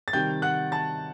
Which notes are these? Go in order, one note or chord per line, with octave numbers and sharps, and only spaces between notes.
A6
C3 D#3 G3 G5 G6
F#5 F#6
A5 A6